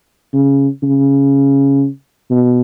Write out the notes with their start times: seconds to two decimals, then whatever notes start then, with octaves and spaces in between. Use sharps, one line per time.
0.33 C#3
0.83 C#3
2.31 B2